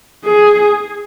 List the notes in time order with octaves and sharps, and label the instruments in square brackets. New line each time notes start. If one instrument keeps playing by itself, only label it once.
[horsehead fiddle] G#4